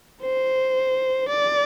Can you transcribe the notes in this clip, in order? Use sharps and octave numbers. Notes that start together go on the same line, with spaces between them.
C5
D5